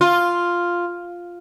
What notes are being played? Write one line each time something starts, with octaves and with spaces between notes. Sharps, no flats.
F4